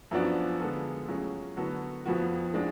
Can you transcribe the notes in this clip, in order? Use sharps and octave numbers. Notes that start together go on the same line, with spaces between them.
F#2 F3 B3 D4 F#4
D3 G#3 B3 F4 A4
A2 F#3 C#4 F4 G#4
D3 F#3 B3 F#4 A4
F2 F3 B3 F#4
A2 F3 G#3 D4